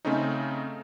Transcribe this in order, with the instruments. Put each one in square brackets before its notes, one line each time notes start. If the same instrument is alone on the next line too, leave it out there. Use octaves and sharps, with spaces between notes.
[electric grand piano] C#3 A3 C4 C#4 D#4